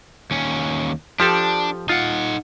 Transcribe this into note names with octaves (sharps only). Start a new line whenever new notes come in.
D#2 C#4
F3 D4 G4 A4
D#4 F4 F#5